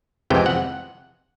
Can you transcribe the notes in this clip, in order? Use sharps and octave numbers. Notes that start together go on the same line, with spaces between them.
F2 C3 E3 G#3 G5
F#5